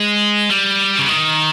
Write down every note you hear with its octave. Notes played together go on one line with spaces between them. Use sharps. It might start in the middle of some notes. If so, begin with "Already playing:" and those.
Already playing: G#3
G3
C#3
D#3